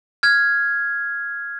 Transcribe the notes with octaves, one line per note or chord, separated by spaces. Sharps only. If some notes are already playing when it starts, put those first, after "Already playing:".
F6 G#6